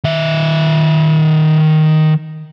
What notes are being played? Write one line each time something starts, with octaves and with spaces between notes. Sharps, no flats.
D#3 E5